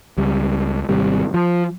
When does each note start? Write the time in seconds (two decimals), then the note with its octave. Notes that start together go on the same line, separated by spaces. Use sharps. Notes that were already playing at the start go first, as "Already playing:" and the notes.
0.18 C#2 G3
0.89 G#1 C3 G3
1.34 F3